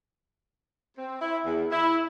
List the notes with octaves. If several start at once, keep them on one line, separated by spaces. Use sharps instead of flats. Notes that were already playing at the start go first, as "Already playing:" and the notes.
C4
E4
E2
E4